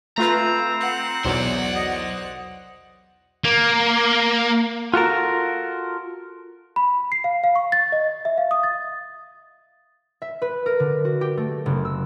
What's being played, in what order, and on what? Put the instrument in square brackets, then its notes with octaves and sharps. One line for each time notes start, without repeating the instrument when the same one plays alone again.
[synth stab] A3 F4 B4 [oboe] C4 [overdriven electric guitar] A#5
[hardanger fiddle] F#5
[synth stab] B1 E2 F#3 [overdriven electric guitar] C5 D5
[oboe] D#5
[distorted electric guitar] A#3
[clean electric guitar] F4 F#4 A4 A#4
[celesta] B5
C7
F5
F5
C#6
A6
D#5
E5
F5
D#6
A6
[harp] E5
B4
A#4
D3
F#4
G4
A3
F#1
E6